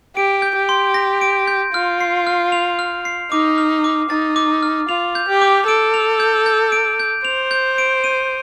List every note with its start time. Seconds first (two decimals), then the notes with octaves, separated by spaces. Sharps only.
0.16 G4 D7
0.42 G6
0.56 G4
0.69 C6
0.94 A#6
1.21 D7
1.48 G6
1.74 F4 F6
2.00 C7
2.27 F6
2.52 F7
2.79 F6
3.05 C7
3.31 D#4 D6
3.58 F6
3.84 D6
4.10 D#4 A6
4.36 D6
4.63 F6
4.89 F4 F7
5.15 G6
5.28 G4
5.42 D6
5.67 A4 D7
5.94 F7
6.20 G6
6.46 G6
6.72 D7
7.00 G6
7.25 C5 F7
7.51 G6
7.78 D7
8.04 D#7